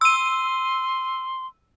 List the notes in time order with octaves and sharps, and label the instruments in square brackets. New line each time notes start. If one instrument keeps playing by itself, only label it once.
[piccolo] C6 [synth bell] E6 D#7